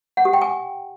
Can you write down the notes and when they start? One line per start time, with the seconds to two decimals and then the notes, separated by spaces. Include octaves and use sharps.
0.17 F#5
0.25 G4
0.33 G5
0.42 G#5